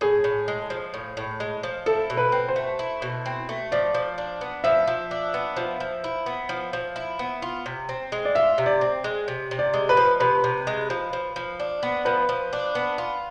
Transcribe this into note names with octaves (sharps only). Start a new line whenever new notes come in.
A2 G#4
A2
G#3
F3
A2
A2
G#3
F3
E4 A4
B2
B4
C4
C5
A3
E4
B2
C4
A3
F3 D5
F3
D4
B3
F3 E5
F3
D4
B3
F3
F3
E4
B3
F3
F3
E4
B3
F4
C3
C4
G#3
D5
F4 E5
C3
D5
C4
G#3
C3
C3
D5
G#3
B4
F3
C3 B4
C3
G#3
F3
F3
F3
D4
B3
F3 B4
F3
D4
B3
F4